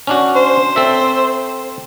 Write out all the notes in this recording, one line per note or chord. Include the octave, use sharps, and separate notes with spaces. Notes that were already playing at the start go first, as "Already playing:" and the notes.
C#4 D4 F#4
C5
C4 A4 E5